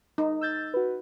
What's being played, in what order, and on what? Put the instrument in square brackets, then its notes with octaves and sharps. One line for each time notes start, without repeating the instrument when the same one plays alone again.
[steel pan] D#4
[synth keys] E6 G6 A6
F#4 B4